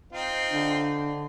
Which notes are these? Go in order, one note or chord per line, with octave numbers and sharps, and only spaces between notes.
C4 D#4 F4
D3 D4